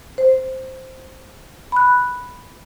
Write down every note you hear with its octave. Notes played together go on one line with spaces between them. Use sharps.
C5
B5 F#6